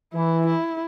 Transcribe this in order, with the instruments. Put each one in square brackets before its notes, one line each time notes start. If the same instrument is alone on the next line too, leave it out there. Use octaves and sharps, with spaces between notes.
[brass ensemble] E3 [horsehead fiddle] E4
[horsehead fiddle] E4